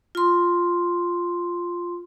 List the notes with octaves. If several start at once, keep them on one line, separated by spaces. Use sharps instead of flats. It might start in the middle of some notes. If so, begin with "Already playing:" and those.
F4 C6